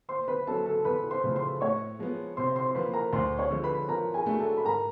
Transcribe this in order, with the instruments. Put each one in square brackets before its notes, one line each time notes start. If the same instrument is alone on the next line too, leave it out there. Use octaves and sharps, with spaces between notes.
[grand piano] A#2 [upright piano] C5 C6
[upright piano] B4 B5
[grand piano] F#3 A#3 C#4 [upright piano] A4 A5
[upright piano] A4 A5
[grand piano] E2 [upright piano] B4 B5
[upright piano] C5 C6
[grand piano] C#3 F3 A3
[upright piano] C5 C6
[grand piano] A2 [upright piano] C#5 C#6
[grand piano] F3 G#3 B3
[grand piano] C3 [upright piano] C5 C6
[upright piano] C5 C6
C6
[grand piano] F3 A#3 [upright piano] B4 B5
[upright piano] A#4 A#5
[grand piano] D2 [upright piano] C5 C6
[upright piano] C#5 C#6
[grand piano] D3 F3 G#3
[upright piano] B4 B5
[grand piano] F3 [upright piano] A#4 A#5
[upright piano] G#4 G#5
[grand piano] A3 D4 F#4
[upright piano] A4 A5
B5
[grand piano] G#2 [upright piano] A#4 A#5